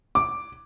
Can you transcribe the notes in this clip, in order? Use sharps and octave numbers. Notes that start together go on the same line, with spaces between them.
D6